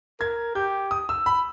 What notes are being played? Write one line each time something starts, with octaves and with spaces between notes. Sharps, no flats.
A#4 G#6
G4 G6
D#6
E6
B5